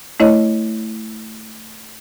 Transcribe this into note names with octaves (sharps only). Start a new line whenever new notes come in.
A3 E4 C#5 D#5